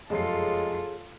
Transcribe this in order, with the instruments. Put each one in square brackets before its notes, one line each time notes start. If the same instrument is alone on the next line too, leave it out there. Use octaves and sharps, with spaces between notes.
[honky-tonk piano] F1 F#2 C7 [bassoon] G#3 [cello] F4 A4 [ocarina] G#4